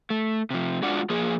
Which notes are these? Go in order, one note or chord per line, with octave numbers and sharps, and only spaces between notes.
A3
C3 F3
G#3 D4 F4 F#4 D5 F#5
F3 A#3 G#4